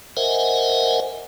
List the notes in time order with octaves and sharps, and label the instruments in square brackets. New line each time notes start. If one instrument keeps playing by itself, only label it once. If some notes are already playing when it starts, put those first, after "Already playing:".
[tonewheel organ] A#4 C5 D#5 E5 F#5 G#5